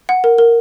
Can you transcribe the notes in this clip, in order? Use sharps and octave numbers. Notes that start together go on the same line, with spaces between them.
F#5
A#4
A#4